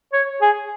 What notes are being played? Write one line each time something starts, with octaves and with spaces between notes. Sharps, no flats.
C#5
G#4